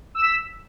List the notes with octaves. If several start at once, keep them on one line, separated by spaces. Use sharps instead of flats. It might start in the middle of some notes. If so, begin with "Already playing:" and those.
E6 B6 E7